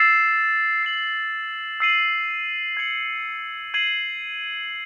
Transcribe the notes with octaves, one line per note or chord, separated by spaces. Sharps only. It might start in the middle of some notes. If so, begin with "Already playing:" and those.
Already playing: E6 A6 C7 E7
E6 C7 F#7
E6 C7 D#7 F#7
G#6 C#7 F#7
G#6 C7 D#7 F#7